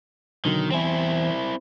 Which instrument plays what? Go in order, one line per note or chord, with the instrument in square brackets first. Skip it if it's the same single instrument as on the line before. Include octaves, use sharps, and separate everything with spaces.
[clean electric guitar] B1 D3 F#3 [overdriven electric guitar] D#3
[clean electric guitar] E2 C5 G#5 [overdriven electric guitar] C4 E4